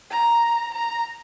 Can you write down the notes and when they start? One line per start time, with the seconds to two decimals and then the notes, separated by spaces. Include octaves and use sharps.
0.11 A#5
0.73 A#5